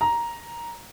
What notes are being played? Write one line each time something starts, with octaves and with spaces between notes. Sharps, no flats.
A#5